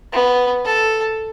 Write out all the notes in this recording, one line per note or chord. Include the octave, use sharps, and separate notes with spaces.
B3
A4